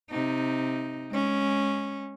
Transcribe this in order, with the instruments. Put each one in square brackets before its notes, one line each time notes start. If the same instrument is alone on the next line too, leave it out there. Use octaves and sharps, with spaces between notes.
[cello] C3 D#4
G#3 C#4